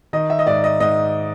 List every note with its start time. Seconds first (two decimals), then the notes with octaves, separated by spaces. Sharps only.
0.13 D#3 D#5
0.30 E5
0.39 D#5
0.47 G#2 D5
0.64 D#5
0.80 G#2 D#5